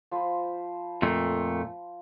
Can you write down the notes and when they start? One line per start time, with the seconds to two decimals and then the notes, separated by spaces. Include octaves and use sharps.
0.11 F3 C5 B5
1.02 F2 A#2 A3